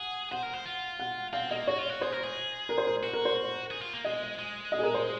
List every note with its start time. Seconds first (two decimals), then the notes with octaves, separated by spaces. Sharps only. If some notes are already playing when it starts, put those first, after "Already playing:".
Already playing: G#4 F#5
0.31 C5 F#5
0.43 A#4
0.54 C5
0.65 F4
1.00 F#5
1.33 C4 F5
1.50 A#3 D#5
1.67 F#4 C#5
1.79 F4
1.89 F#4
2.01 G#4 C5
2.12 A#4
2.23 G#4
2.69 A#4
2.78 C5
2.87 A#4
3.03 F#4
3.13 A#4
3.25 C5
3.71 G#4
3.82 F4
3.94 A#3
4.04 G#3 D#5
4.38 G#3
4.72 D#5
4.79 G#4
4.83 A#4
4.94 C5